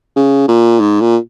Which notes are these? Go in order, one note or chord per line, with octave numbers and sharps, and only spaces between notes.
C#3
A#2
G#2
A#2